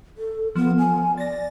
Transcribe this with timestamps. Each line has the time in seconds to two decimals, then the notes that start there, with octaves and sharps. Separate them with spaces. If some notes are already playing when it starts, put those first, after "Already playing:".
0.18 A4
0.55 F3 B3
0.78 G#5
1.18 D5 A6 A#6